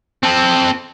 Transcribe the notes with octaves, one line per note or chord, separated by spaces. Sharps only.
C4 A4